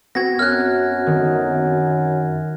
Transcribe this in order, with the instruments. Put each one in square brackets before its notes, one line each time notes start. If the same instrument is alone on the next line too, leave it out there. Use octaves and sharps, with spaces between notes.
[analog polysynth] B3 C4 F#4 [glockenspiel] G#6 A#6
[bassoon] F#2 [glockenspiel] F6 F#6
[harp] D#3